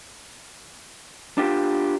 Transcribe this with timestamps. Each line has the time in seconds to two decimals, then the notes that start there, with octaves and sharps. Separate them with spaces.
1.38 D4 F4 G4